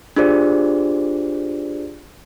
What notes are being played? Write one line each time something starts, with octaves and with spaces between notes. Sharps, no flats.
D4 F4 G4 G#4 C5 D5